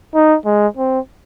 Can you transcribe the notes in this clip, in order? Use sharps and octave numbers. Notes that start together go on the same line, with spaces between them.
D#4
G#3
C4